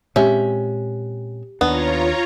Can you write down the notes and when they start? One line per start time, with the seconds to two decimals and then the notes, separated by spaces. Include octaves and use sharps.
0.16 A#2 G#3 C4 C#4 G4 E5
1.61 D#2 B3 D4 F4 C#5 A#5